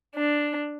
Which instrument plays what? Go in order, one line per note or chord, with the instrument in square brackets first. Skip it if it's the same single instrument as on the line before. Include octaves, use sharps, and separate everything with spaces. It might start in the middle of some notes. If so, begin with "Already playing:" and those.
[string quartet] D4